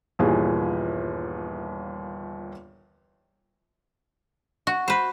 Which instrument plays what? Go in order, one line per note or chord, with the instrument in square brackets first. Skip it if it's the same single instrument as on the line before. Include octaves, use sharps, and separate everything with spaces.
[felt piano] G1 D#2 A#2 E3 G#4
[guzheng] F#4
[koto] B4 C5